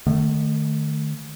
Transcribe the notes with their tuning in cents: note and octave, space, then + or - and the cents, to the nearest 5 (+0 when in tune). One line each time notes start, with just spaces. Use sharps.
D#3 -45 A3 +0